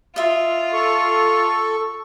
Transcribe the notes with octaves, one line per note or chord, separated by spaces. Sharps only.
F4 D#5 E5
A4 C#6